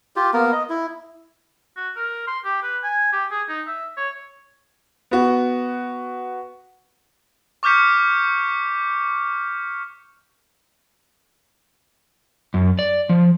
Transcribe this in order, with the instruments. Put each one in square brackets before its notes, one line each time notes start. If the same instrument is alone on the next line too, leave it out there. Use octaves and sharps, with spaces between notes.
[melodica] F4 G4
A#3 B3 A#4
D#5
E4
[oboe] F#4
A#4
C6
G4
B4
G#5
G4
G#4
D#4
E5
C#5
[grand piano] B3 F#4
[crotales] C#6 D6 F6 G6 B6 C#7
[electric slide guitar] F#2
D5
F3